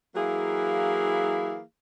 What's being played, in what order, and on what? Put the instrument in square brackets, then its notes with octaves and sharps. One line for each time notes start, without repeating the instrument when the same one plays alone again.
[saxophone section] E3 F#3 A#3 E4 G#4 F5